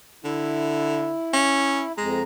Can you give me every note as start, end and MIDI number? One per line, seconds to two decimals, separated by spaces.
0.24 1.13 50
0.24 1.92 64
1.33 1.83 61
1.97 2.22 41
1.97 2.21 56
1.97 2.22 82